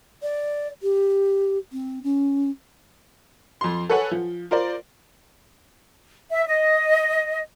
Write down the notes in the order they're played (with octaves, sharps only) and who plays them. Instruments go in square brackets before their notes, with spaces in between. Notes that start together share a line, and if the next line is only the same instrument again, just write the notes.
[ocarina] D5
G4
C4
C#4
[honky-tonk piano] F2 C6
A4 B4 C#5 F#5 G#5
F3
F4 A#4 C5 D5
[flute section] E5
D#5